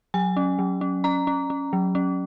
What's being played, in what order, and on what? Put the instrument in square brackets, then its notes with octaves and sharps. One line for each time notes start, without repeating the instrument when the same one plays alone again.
[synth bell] F#3 G#5
C#4
F#3
C#4
C#4 A#5
C#4
C#4
F#3
C#4